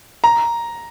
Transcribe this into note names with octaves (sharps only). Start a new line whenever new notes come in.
A#5